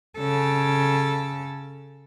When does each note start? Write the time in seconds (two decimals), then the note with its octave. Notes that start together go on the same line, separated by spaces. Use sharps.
0.17 C#3 A4